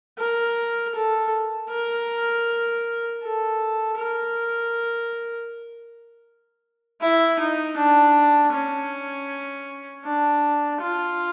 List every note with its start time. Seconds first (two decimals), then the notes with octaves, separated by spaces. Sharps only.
0.19 A#4
0.95 A4
1.70 A#4
3.22 A4
3.97 A#4
7.01 E4
7.39 D#4
7.77 D4
8.52 C#4
10.05 D4
10.81 F4